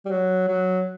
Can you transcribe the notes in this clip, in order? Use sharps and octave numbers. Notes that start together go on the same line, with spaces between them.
G3
F#3
F#3